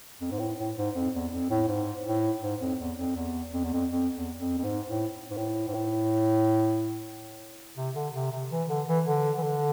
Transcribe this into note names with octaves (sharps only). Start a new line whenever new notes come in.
F2
G#2
A2
A2
G#2
F2
E2
F2
A2
G#2
A2
G#2
F2
E2
F2
E2
F2
E2
F2
F2
E2
F2
F2
G#2
A2
G#2
A2
G#2
A2
C3
D3
C3
C3
E3
D3
E3
D3
E3
D3